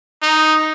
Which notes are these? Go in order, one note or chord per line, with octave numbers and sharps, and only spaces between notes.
D#4